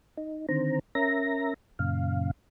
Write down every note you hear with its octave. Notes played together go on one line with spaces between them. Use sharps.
D#4
D3 D#3 C4 C5 A#5
C#4 A#4 E5 A#5 A#6
F#2 A#2 C#3 F5